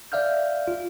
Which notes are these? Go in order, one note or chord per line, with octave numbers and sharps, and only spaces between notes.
D5 E5 F5 F6 G6
F4